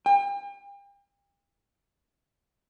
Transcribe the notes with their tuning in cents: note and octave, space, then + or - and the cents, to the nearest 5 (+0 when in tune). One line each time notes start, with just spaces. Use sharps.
G5 +40